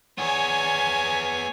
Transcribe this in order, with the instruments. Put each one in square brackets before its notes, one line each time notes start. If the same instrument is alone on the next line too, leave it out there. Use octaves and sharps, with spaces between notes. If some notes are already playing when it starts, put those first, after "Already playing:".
[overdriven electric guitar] B3 G#4 [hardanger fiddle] C#5 G#5